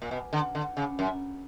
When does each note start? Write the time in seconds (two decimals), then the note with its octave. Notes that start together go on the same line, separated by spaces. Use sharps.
0.02 A#2
0.11 B2
0.33 D3
0.55 D3
0.77 C#3
0.99 F#2